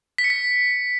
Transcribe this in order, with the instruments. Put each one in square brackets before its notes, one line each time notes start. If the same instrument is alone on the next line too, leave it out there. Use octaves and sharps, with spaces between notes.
[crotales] B6
C#7
B6